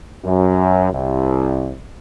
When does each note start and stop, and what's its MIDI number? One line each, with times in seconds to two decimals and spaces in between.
0.23 0.90 42
0.92 1.73 36